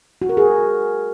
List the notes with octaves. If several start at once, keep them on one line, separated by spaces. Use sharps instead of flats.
F#4
A#4
G#4